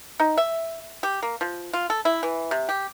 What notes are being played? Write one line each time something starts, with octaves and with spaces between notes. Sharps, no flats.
D#4
E5
G4
A#3
F3
F4
A4
E4
E3
C3
G4